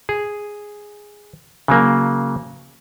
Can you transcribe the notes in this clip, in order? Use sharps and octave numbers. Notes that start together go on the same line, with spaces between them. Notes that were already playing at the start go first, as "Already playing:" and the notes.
G#4
C#3 F#3 A#3